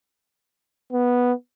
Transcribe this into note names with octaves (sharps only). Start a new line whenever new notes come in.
B3